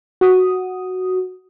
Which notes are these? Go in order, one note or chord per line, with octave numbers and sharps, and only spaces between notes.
F#4 D#6